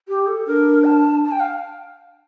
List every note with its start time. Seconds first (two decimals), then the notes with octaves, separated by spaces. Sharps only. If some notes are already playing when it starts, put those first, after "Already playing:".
0.08 G4
0.27 A4
0.47 D4 A#4
0.85 A5
1.24 A5
1.32 G5
1.40 F5